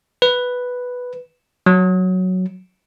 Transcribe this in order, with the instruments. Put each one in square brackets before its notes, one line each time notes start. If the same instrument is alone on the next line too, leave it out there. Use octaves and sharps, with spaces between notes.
[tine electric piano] B4
F#3